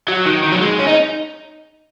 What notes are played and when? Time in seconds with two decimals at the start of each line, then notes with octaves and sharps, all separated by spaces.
0.08 F#3
0.26 D#3
0.43 D#3
0.52 F#3
0.61 G#3
0.79 C#4
0.87 D#4